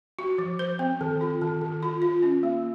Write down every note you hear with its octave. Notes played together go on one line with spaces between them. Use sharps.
F#4
F3
C5
C4
D#3
F4
D#3
D#3
F4
F4
C#4
A#3